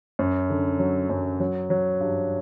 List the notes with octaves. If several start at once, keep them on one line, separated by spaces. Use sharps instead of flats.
F#2
D3
F#3
F#2
F#3
F#3
G2